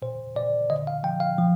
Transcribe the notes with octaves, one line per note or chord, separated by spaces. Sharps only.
A#2 C5
A#2 D5
D3 D#5
F5
F3 G5
F5
F3